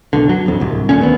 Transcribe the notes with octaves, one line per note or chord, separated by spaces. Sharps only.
F#1 B1 D3
F#3
D1 G1 F2
D1 C2
D#1 A#2 D3 C#4
D2 D#3 B3